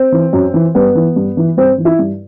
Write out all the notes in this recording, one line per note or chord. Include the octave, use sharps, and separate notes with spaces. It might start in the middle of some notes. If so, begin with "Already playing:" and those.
Already playing: C4
E3
F#2
E3
G2 B3
E3
G2
E3
G2 C4
E3
E4
G2